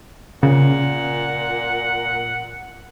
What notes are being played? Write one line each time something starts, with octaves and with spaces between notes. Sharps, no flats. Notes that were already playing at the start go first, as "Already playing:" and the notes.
A#2 C#3 F#5